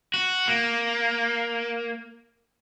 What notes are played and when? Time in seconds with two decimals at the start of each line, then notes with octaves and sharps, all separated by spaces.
0.14 F#4
0.48 A#3